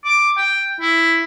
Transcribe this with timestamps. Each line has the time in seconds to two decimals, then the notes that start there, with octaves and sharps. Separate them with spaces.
0.06 D6
0.37 G5
0.80 E4